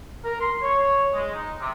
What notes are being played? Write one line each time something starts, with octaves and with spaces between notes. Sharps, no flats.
A#4
C6
C#5
G#3
D#4
C3